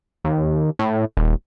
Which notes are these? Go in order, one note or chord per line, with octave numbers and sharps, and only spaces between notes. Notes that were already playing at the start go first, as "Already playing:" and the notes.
D#2
A2
D#1